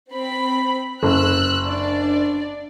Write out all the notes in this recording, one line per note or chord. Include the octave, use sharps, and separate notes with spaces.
C4 B5
F#1 E6 F#6
D4 D5